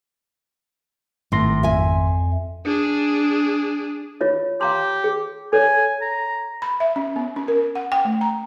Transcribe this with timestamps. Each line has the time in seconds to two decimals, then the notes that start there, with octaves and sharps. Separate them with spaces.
1.32 G#1 A2 C6 A#6
1.63 F2 E5 G#5
2.65 D4 G#4
4.21 F4 C#5 D#5
4.61 G4 F5 A#5 C6
5.04 G#4
5.53 A4 C#5 D5 G#5
6.01 A#5
6.62 B5
6.80 E5
6.96 C#4
7.16 B3
7.36 C#4
7.48 A#4
7.75 F#5
7.92 G5
8.05 A3
8.21 A#5